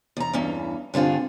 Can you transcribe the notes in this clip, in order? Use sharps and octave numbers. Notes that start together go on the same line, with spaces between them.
E2 A#5
E2 G2 E3 C#4
G2 D3 C4 F4 G#4